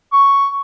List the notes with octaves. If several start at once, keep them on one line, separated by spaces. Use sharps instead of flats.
C#6